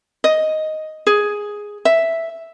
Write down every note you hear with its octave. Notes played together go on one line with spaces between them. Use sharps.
D#5
G#4
E5